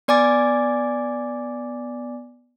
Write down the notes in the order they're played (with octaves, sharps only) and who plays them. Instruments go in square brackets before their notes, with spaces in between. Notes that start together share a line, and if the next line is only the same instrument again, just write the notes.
[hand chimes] B3 D5 G#5 D6 A6